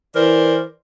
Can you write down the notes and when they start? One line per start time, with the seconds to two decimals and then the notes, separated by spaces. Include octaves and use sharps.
0.15 E3 A#4 C5 D5